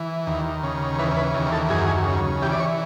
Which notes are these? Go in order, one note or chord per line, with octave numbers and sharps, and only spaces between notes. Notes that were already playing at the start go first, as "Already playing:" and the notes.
Already playing: E3
D#2
C#3
E3 B4
B4
D#2
A4
F#2 G#4
C#3
E3 G4
D5
C#5